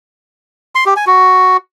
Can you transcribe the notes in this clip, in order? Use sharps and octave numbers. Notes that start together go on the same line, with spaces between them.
C6
G4
G#5
F#4